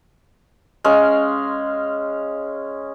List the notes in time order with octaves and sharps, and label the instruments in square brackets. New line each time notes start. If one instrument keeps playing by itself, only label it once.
[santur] G#3 C#4 F5